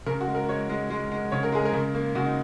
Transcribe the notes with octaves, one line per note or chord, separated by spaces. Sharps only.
C#3 A#4
F#4
G#3
A#4
G#3 C#5
G#3
G#3
G#3
C#3 C#5
A#4
G#3 G#4
A#4
C#3
A#3
C#3 F#4
D#4